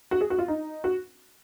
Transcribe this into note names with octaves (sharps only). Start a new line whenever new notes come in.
F#4
G#4
F#4
F4
D#4
F#4